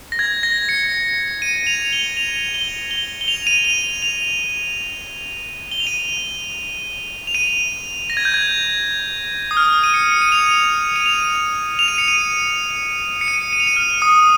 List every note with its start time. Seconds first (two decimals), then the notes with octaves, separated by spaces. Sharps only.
0.12 A#6
0.19 G#6
0.43 A#6
0.69 C#7
1.42 D#7
1.67 F7
1.93 G7
2.17 F7
2.54 G7
2.91 G7
3.21 G7
3.28 F7
3.47 D#7
3.65 F7
4.02 F7
5.71 G7
5.80 F7
5.87 D#7
7.27 F7
7.35 D#7
8.10 A#6
8.17 G#6
8.25 G6
8.34 G#6
9.51 D#6
9.57 F6
9.83 D#7
9.94 C#7
10.12 C#7
10.22 D#7
10.32 F7
10.96 D#7
11.06 F7
11.79 F7
11.88 D#7
11.98 C#7
12.08 D#7
13.21 C#7
13.28 D#7
13.53 D#7
13.60 F7
13.67 D#7
13.76 F6
14.02 D#6